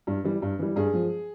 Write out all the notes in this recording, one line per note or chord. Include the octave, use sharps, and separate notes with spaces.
G2
E3 G3
G2
E3 G3
G2 G#4
F3